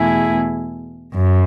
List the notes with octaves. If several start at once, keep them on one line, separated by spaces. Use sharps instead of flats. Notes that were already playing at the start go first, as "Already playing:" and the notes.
Already playing: E2 B2 A3 E4 G#4
F#2